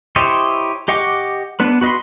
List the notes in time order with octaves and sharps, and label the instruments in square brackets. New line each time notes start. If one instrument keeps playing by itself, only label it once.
[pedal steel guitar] E4 G4 C5 C#5 D#5
G4 D#5 F#5 C#6 D6
B3 D4 B4
F#4 B4 D#5 B5 C6